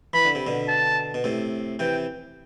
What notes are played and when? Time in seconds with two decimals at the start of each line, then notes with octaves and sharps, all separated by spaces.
0.13 E3 B5
0.25 D3
0.35 C3
0.47 B2 D3
0.68 A5
1.14 B2
1.24 A2 C3
1.79 C3 E3 G5